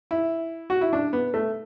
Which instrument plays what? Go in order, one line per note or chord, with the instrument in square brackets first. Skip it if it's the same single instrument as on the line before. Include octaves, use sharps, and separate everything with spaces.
[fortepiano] E4
F#4
E4
D4
B3
A3